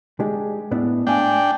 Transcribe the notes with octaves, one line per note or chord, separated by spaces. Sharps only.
G#3 D4 G4
A2 B3 D4
A3 D4 F5 G5 G#5